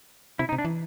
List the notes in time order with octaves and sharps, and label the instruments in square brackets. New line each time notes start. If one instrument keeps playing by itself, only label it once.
[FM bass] C3 [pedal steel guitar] E4
[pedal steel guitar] D#4
[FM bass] C3
[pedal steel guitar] D4
[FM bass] E3